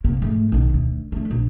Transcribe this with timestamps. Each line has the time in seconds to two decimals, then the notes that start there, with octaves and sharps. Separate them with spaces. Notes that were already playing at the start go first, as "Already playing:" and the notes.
0.04 C3 A#3
0.22 G#2 A3
0.52 B1 D#3
0.74 D2
1.12 D3 A3
1.31 A#1